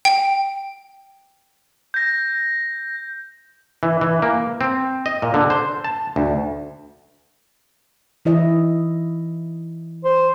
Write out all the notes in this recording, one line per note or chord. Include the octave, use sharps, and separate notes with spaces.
G5
G6 A#6
E3
E3
A#3
C4
D#5
A#2
D3
C5
A5
D2
E3 E4 D#5
C5